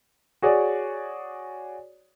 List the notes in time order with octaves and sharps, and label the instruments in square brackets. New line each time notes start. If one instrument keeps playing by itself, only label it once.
[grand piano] F#4 G#4 C#5 D5